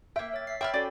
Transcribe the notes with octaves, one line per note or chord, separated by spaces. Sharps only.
A#3 E5 G5
C#5 A6
B6 C7
C#5 E5 G5 B5 E6 F6 A6
C#4 F#4 A4 D5